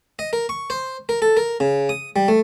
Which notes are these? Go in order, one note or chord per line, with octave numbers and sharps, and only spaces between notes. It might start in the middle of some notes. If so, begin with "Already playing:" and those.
D#5
A#4
C#6
C5
A#4
A4
A#4
C#3
D#6
G3
A3